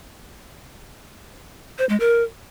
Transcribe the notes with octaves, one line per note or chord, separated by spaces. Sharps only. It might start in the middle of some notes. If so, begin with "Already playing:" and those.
C5
G#3
A#4